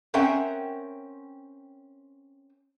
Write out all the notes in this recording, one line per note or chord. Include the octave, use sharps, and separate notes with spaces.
C4 C#4 A#4 E5 F#5 G5